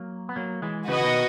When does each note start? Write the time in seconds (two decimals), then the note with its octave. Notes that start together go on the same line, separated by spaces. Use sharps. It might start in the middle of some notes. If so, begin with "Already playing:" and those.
Already playing: F#3 A#3
0.29 B3
0.36 F#3 A#3
0.62 E3 G#3
0.88 C#3 E3 F#4 B4 D#5 F#5
1.00 E3
1.04 B2 D#3